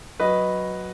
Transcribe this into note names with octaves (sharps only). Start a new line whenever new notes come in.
F#3 B4 D#5